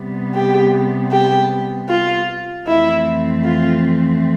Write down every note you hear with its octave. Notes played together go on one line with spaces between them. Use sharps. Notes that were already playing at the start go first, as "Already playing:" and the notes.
Already playing: C3 G3 B3
G4
G4
F4
F2 E3 A3 C4 E4
F4